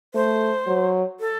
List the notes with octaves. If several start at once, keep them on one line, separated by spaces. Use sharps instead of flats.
A3 C5
F#3
A4